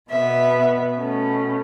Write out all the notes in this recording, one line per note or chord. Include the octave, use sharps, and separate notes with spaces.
B2 B3 E5
B2 A3 C#4